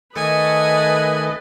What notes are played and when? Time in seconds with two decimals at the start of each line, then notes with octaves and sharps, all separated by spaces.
0.16 D#3 A3 A4 B4 D#5 G#5